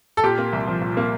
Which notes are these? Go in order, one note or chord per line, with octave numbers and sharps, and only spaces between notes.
A4
A#2 G4
A#3
C2
F3
A#2
A#3